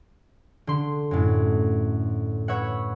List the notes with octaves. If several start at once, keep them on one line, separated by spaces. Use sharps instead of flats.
D3 C6
F#2 A2
B4 C#5 E5 F#5